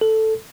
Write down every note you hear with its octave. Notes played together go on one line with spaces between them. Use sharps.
A4